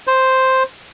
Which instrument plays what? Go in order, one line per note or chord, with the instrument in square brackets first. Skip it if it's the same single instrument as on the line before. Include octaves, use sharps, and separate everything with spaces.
[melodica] C5